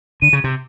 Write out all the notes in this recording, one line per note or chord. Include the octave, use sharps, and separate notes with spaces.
D3 D#7
C#3
C3